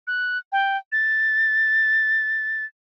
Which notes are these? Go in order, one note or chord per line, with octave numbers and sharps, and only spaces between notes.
F#6
G5
A6